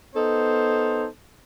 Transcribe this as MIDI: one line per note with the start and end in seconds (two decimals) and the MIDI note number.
0.15 1.07 59
0.15 1.07 63
0.15 1.07 69
0.15 1.07 72